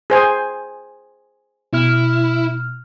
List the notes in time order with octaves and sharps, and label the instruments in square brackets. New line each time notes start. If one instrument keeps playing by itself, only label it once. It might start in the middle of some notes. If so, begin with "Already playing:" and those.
[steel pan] G#4 C5 G#5
[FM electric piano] B2 F6 [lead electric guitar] E4